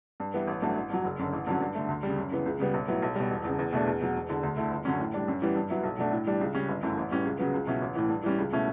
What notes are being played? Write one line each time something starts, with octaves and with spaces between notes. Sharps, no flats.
G2
E3 G3 B3 E4
A1
G2 F#3 A3 D4
A1
G2 F#3
F#1
F#2 D3
A1
G2 D3 F#3 C#4
G2
D3 A3
D2
C#3 G3
F#2
C#3 E3 B3
C#2
C#3 G3 B3
B1
A2 F#3 B3 E4
B1
B2 G3
E1
E2 C#3
E2
B2 A3 D4
E2
B2 F#3
E1
E2 D3
D2
D3 A3 E4
G1
F#2 D3 F#3 C#4
A2
G3 D4
F#2
E3 G3 B3
G2
F#3 B3 E4
B1
B2 F#3 A3 D4
A2
E3 G3 D4
C#2
C#3 G3 C#4
G1
F#2 E3 A3
A1
A2 E3 G3 C#4
C#2
C#3 F#3 B3
C#2
B2 F#3 C#4 E4
A1
A2 E3
G2
E3 G3 C#4
C#2
B2 A3 C#4 E4